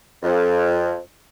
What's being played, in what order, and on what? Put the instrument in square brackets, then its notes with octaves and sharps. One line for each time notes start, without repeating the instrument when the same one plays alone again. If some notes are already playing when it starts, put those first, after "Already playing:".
[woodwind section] F2